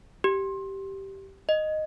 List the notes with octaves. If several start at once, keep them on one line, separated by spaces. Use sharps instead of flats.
G4
D#5